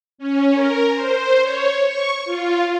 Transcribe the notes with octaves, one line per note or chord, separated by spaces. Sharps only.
C#4
A#4
C5
C#5
C#6
F4